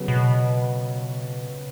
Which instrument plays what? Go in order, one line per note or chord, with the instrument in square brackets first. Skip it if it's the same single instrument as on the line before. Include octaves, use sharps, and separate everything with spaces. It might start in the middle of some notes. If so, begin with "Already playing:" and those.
Already playing: [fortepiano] C#3 F#3 B3
[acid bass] B2